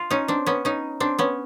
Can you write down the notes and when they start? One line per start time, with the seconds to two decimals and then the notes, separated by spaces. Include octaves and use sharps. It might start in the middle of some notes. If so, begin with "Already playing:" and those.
Already playing: F4
0.10 C#4 D#4
0.28 C4 D4
0.46 B3 C#4
0.65 C#4 D#4
1.00 C4 D4
1.19 B3 C#4